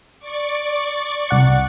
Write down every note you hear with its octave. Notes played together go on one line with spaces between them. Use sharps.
D5 C#6 D6
C2 F#5 C#7